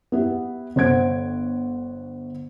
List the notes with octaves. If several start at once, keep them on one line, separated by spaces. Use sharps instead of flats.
B3 E4 G4
G1 C5 F#5 G#6 D7